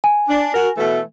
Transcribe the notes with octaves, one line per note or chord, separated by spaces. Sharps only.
G#5
D4
F#4 A#4
B2 E3 A3